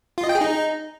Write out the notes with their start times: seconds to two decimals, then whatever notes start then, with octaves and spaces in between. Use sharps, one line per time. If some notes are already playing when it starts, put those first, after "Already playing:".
0.18 F4
0.24 D#5
0.29 G5
0.35 G#4
0.41 D#4